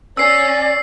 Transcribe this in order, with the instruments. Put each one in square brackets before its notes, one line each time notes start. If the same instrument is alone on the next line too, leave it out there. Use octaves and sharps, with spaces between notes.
[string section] C#4 [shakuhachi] D5 [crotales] E6 C7